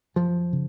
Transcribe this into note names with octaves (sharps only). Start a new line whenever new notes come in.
F#2 F3
C#3